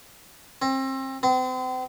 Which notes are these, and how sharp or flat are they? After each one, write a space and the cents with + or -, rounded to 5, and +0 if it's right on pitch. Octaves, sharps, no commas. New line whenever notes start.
C4 +30
C4 -40